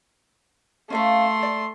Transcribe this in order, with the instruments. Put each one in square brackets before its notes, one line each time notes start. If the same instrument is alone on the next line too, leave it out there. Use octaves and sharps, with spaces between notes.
[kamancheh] A3 C6 [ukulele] C#4 E5 F5
[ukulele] D5